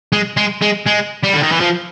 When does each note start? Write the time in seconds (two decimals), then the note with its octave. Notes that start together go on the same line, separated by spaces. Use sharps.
0.12 G#3
0.37 G#3
0.61 G#3
0.86 G#3
1.23 G3
1.33 D3
1.42 D#3
1.52 E3
1.60 F3